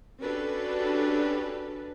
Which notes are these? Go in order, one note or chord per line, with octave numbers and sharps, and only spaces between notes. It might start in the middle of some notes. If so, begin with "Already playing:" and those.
C#4 D4 F#4 G4 A4 B4